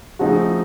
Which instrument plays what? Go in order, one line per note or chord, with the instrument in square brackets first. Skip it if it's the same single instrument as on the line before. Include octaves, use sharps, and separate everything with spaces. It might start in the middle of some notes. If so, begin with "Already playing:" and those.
[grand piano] C#3 F3 A3 C4 D#4 [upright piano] F#4 G#4